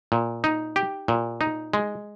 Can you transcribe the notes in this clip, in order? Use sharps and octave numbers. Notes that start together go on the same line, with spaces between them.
A#2
D#4
G4
A#2
D#4
G#3